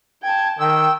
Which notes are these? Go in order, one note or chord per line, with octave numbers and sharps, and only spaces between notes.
G5 A5 G#6
D#3 G5 E6